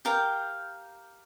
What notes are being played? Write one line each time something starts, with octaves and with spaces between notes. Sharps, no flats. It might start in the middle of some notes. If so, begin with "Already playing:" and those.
G4 A#4 F5 G5